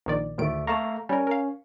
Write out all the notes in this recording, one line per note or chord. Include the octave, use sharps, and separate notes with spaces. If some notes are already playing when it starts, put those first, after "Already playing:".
A#1 D#3 D5
D2 A2 D#3 A3 D7
A3 F5 A5 A#5 C#6
G3 C#4 A#4
A#4 F5